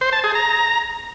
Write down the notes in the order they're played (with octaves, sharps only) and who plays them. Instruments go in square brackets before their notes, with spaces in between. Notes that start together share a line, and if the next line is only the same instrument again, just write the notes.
[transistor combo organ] C5
A5
G#4
A#5